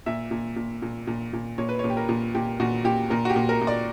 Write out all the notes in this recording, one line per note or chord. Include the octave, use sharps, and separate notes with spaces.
A#2 E5
A#2
A#2
A#2
A#2
A#2
A#2 C#5
B4
A#2 C#5
G4
A#4
A#2
A#2 G4
A#2 F#4
A#2 G4
A#2 A#4
F#4
G4
A#2
A#4
A#2
D5